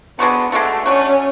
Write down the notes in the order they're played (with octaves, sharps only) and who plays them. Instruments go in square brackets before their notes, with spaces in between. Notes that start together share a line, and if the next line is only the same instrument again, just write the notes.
[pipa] G#3 D4 F#4 A4 [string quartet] B3
[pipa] G#3 D4 F#4 A4 [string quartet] A3
[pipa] A3 D4 F#4 [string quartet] C#4